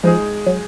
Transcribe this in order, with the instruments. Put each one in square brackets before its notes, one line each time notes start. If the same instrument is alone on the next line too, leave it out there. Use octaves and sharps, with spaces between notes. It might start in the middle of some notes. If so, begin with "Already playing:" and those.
[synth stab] F3 [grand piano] G#3 D#4 G#4
[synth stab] F#3